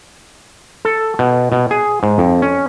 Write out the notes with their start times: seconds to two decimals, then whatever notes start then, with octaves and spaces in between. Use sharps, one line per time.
0.85 A4
1.19 B2
1.52 B2
1.71 G#4
2.03 G#2
2.18 F2
2.42 C#4